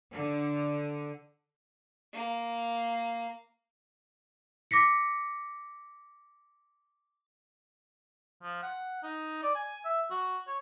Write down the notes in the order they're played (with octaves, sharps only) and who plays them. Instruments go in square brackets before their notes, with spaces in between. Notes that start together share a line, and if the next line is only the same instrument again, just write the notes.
[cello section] D3
[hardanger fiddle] A#3
[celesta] D6 A#6 B6 C#7
[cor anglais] F3
F#5
D#4
D5
G#5
E5
F#4
C#5